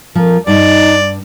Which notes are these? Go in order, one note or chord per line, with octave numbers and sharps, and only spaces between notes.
F2 F3 A#4
G2 D#4 D5